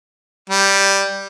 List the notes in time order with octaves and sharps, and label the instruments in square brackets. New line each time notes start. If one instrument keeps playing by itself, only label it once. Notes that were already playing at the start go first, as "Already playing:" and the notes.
[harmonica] G3